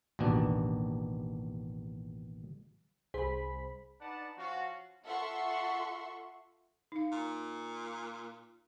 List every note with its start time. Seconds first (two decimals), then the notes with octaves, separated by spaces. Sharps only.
0.19 A1 D#2 B2 D4
3.14 C2 G#4 C5 B5 B6
4.00 D4 D#4 B4 D5 F#5 A5
4.37 F3 C#4 F4 F#4
5.05 F4 A4 E5 F#5 C6 C#6
6.92 D#4 F5
7.12 A#2